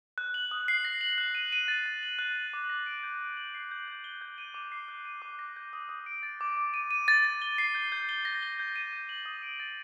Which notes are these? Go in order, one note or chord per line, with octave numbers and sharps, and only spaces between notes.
F#6
F#7
D#6
C7
A#6
F#7
F#6
D#7
D#7
A6
A6
F#7
F#6
F#7
D6
A#6
D7
G6
G6
F#7
C7
G6
G6
G7
G6
D#7
D6
C7
F#6
D#7
D6
A#6
G6
D#6
D#6
D7
A6
D6
D6
D#7
D#7
A6
A6
G7
C7
G6
G6
G7
A#6
G7
G6
D#7
G6
F#7
D#6
D7
A6